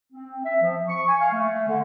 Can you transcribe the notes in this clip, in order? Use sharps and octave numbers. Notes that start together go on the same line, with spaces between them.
C4
E5
F3
C#6
G#5
F5
A3
D3